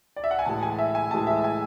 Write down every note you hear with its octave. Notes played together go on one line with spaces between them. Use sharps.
D5
E5
F#5
G#5
A2 E3 G#3 A5
G#5
E5
G#5
A2 E3 G#3 A5
E5
G#5